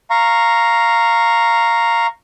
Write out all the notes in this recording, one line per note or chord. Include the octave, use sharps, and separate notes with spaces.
F5 A#5 C#6